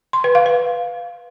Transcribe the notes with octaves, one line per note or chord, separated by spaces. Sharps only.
C6
B4
F5
B4